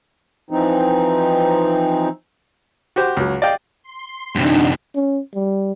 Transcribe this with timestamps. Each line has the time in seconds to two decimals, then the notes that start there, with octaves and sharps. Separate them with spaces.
0.50 E3 F3 C4 D#4
2.96 F#4 G4 C5
3.17 C#2 F#3
3.42 D5 D#5 F5 G5
3.83 C6
4.35 F#2 C3 D4 D#4
4.95 C#4
5.35 G3